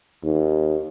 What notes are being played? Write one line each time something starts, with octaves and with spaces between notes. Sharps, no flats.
D#2